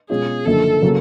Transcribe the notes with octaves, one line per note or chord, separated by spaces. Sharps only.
B2 G#3 C#4 F4 G#4
F#1 F#2 D3 F3 A4
C#3 F#3 A#3